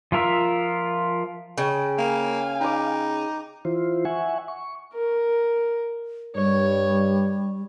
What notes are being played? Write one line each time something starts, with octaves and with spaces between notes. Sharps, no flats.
F3 F4 A#4 E5
C#3 G5
A#3 F5 G#5
D#4 B5 D6
E3 E4 F4 C5
E5 F#5 G#5 C#6
C#6
A#4
G2 G3 C#5